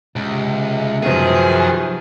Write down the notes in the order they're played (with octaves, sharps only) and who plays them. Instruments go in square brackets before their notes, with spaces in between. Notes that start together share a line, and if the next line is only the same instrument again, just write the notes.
[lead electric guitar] C#2 [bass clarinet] C3
[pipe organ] F#2 D#3 [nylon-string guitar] F3 B3 [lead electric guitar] G#4